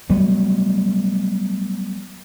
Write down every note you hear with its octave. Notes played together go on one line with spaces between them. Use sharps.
F#3 G3 A3 B3